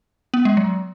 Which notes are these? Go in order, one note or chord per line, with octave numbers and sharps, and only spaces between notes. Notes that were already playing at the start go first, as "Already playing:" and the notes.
B3
G#3
F#3